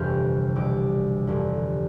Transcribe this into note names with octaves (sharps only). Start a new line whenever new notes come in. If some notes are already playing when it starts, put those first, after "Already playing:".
Already playing: G1 F2 C3 E3 F6 G6
C2 B2 D6
G1 F2 D3